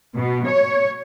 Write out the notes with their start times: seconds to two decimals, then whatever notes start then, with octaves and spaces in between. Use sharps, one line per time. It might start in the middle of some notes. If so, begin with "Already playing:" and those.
0.15 B2
0.47 C#5